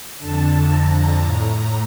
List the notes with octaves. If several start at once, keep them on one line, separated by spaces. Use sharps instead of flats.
F2 D3 A5
A#5
A2 A#5